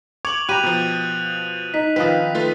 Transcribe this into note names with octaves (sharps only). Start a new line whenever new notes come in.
C#6 D6 G#6 F7 F#7
G4 A#5 B5 F#6 D#7 F7
B2 F3
D#4 B6
D#3 F3 C4 B4 D#6 B6
A3 F4 B4